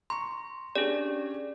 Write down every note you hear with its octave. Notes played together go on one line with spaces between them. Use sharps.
A#5 C6 C#6
C#4 D4 G4 G#4 D5